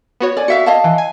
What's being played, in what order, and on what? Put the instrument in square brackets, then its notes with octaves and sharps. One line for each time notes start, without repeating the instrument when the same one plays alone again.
[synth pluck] B3 F#4 C#5
[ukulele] D5 G#5
[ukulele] F#4 E5 F5 [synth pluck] C#7
[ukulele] D#5 F5 A5
[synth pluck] E3
G#5